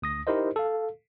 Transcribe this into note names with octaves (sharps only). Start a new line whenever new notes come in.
D2 D#6 A#6
D#4 E4 G4 A#4 C5 D#5
A4 F5